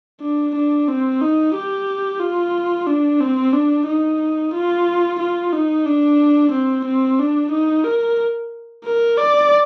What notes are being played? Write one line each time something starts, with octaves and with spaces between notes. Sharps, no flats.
D4
D4
C4
D#4
G4
F4
D4
C4
D4
D#4
F4
F4
D#4
D4
C4
C4
D4
D#4
A#4
A#4
D5